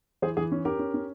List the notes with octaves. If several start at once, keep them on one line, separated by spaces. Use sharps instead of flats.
E3 G#4 C5
E3 G#4
C#4
C#4 G4 A#4
C#4
C#4